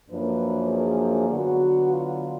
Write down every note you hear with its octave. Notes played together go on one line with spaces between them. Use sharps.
F#2 F3 A#3 D4 B4
G#4
D3 F#3 B3 F#4
F4